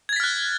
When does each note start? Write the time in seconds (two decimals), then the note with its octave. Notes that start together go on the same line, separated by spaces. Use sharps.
0.09 G#6
0.13 A6
0.16 B6
0.20 F6
0.23 F#6